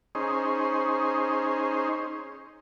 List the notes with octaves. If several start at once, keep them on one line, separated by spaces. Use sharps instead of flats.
C#4 D#4 G#4 C5